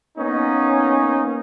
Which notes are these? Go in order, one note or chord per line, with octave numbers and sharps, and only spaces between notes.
A#3 B3 C#4 D#4